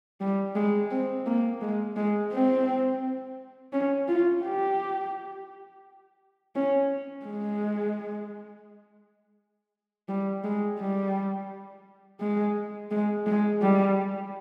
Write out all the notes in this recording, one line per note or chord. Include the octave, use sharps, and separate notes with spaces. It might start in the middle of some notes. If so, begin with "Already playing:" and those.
G3
G#3
C4
A#3
G#3
G#3
C4
C#4
F4
G4
C#4
G#3
G3
G#3
G3
G#3
G#3
G#3
G3